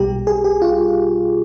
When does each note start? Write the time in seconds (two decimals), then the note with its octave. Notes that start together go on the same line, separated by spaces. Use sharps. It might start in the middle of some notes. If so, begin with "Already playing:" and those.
Already playing: B1 B2 G3 G4
0.27 G#4
0.44 G4
0.62 F4